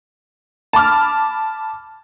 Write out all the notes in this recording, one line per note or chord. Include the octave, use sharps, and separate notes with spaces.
A5 B5 D6 F6